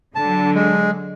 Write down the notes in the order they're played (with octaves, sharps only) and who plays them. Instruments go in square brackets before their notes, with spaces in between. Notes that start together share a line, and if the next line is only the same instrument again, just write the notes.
[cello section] D3 F#3 [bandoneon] A5
[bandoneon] G#3